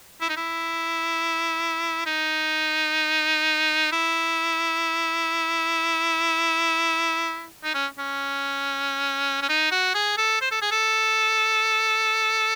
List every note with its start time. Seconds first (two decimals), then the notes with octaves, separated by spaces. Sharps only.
0.21 E4
0.29 D#4
0.37 E4
2.06 D#4
3.92 E4
7.64 D#4
7.74 C#4
7.99 C#4
9.42 C#4
9.49 D#4
9.71 F#4
9.94 G#4
10.18 A4
10.41 C5
10.51 A4
10.62 G#4
10.71 A4